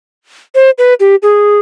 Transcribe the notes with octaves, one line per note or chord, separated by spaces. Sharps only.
C5
B4
G4
G#4